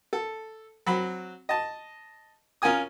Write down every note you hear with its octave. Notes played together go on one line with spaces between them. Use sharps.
A4
F#3 C4 B5
D#5 A5
C#4 F4 A#4 G#5 D#6